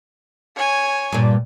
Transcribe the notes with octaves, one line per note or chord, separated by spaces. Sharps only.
C#5 G#5
G2 A#2